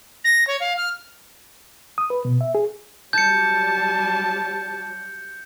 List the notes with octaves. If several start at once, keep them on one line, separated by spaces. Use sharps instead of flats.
A#6
C#5
F5
F6
D#6
B4
B2
E5
G#4
F#3 G3 A5 G6 C#7